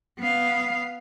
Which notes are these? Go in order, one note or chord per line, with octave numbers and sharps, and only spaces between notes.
B3 F5